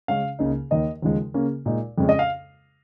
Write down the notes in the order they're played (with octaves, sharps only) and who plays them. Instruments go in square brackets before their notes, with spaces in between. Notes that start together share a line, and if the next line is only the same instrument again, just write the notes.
[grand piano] C#3 G#3 C#4 F5
C#2 C#3 A#3 D#4
D#2 D#3 A#3 D#4 D#5
D#2 C#3 F3 G#3
C#3 A#3 C#4
A#2 G#3 D#4
F2 C#3 G#3 C#4
D#5
F5